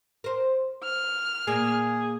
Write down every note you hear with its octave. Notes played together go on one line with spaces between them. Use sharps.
A#4 C5
F6
A#2 A#3 G#4